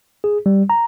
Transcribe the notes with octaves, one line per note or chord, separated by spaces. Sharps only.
G#4
G3
A#5